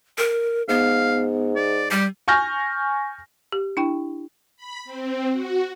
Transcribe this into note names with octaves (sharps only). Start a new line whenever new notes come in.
A#4
G#2 B3 F5
D5
G3 G4
G#5 C#6 F6 G6 A#6
G4
D4 E4 G5
B5
C4
F#4